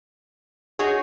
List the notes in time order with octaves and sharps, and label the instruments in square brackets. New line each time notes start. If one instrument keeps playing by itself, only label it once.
[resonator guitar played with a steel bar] D#4 F#4 C#5 [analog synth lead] G#4